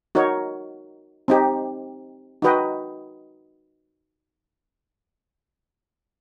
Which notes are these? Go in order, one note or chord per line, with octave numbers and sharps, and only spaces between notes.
D#4 F#4 A#4 C#5
C4 D#4 G4
D#4 F#4 B4 D#5 G5